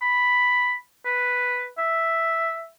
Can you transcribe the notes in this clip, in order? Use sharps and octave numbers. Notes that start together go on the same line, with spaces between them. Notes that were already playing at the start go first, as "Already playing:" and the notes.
B5
B4
E5